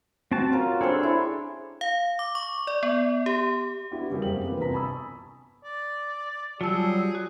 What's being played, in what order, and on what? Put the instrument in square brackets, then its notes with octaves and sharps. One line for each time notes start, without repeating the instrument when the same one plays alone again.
[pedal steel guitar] C4 A5 [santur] F#4
[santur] C#4 A#4 [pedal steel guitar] F4
[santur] G3 C4 C6 [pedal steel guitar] D4 G#4 A4
[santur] E4 C#5
[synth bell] F5
D6
C#6
D5
B3
G4
[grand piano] B3 D4 E4 F#4 G4
C#3 G3 F#4 G#4 A#4
F1 F#2 A#3 G4 C5 F#7
D3 E3 A#3 C4 F4 B4
G1 C3 A#4 A5 A#5 B6
G#5 A5 B5 C#6 D#6 E6
[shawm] D5
[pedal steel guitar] F#3 G3 [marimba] F4 A5 E6 [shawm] G#4
[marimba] F#4